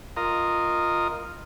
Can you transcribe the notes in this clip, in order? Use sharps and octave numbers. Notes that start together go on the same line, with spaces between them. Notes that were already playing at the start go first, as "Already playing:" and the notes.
F4 A#4 D#5